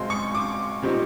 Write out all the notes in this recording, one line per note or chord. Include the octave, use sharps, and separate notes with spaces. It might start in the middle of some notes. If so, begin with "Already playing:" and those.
Already playing: B1 B2 G#3 C4 C6
C#6
D6
A#2 G3 C4 D#4